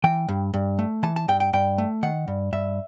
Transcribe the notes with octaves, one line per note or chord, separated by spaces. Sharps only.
E3 G5
G2
G2
A3
E3 A5
A5
G2 G5
G5
G2 G5
A3
D#3 F#5
G2
G2 E5